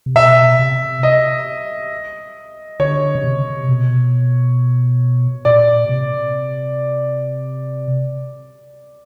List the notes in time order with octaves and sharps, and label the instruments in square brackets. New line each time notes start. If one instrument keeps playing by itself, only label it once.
[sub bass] C3
[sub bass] B2 [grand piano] E5
[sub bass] C3
[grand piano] D#5
[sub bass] D3 [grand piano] C#5
[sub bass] C#3
C3
B2
[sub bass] A#2 [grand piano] D5
[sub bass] C3